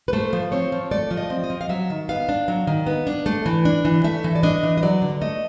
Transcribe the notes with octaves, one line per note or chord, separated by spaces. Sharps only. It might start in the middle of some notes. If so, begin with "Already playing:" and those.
B4
A3 C5
F3
C4 C#5
F3
A3 D5
F3
D#5
C4
D#5
F3
F5
F#3 E5
D#3
B3 F5
D4
F#3
D#3
B3
D4
A3
E3
D4
E3
A3 E5
E3
D5
D4 D#5
E3
D#5
F#3 D5
D3
A3 D#5